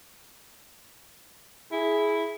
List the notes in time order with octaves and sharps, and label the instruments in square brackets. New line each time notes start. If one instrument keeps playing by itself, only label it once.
[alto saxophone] E4 [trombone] G#4